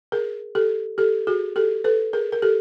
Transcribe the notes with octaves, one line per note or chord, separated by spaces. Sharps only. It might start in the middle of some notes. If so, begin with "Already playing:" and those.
G#4 A#4
G4 A4
G4 A4
F#4 G#4
G4 A4
A4 B4
G#4 A#4
A#4
G4 A4